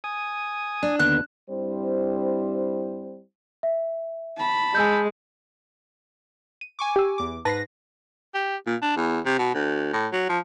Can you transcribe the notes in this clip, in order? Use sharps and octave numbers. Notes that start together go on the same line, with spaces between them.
G#5 D#6
D4
D#2 D3 B3 F#6
G2 G3 C4 E4 C5
E5
A5 B5
G#3 G#5 E6 G6
D#7
G#5 C#6 D6
G4 E6
E2 D6
G#2 B4 A5 B5 A#6 C7
G4
A#2
D4
E2
C3
B2
D2
A2
F#3
F3